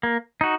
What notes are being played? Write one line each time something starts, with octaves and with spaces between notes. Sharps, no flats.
A#3
D#4 F#4